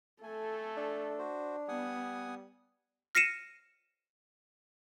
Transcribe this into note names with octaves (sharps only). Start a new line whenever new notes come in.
A3 A4 G#5
D4
F#4 C5
G3 B3 F#5 G#5 D#6
F6 A#6 C7 C#7 D#7 E7